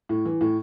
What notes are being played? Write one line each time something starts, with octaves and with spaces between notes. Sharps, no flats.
A2
E3
A2